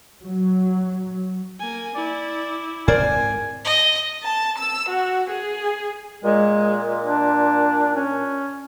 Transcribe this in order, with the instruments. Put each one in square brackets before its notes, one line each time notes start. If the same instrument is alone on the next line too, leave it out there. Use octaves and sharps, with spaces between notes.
[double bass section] F#3
[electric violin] A#3 G#5
[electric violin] E4 [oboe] D5
[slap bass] G#2 C4 [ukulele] A#4 C5 D5 [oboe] G#5
[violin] D#5
[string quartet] A5
E6
F#4
G#4
[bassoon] A#2 [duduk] G#3
[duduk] D4
C#4